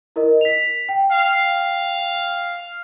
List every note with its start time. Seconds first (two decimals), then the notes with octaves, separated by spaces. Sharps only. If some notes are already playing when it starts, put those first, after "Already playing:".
0.16 E4 A#4 D#5
0.41 B6 F7
0.89 G5
1.12 F5